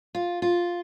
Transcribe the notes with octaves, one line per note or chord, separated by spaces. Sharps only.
F4
F4